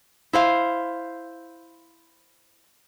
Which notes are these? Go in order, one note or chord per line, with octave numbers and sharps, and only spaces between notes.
E4 C5 F5